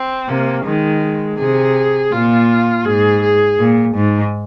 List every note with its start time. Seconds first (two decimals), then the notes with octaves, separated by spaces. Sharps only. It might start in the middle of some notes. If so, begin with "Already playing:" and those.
Already playing: C4
0.28 C3 A#3
0.65 D#3 G#3
1.39 C3 G#4
2.12 A#2 F4
2.85 G#2 G#4
3.22 G#4
3.59 A#2
3.96 G#2